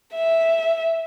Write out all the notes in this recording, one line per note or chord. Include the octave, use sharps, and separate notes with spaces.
E5